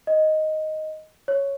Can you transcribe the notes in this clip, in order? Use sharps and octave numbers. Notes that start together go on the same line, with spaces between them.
D#5
C#5